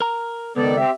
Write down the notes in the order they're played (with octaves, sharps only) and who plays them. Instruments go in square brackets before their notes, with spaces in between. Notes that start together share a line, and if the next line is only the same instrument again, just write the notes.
[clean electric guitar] A#4 A#5
[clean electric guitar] C#2 [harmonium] D#3 A4 D5 [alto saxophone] B3
[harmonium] C4 G4 [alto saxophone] E5